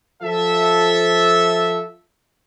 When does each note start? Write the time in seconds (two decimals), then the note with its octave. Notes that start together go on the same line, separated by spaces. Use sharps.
0.23 F3 A4 E5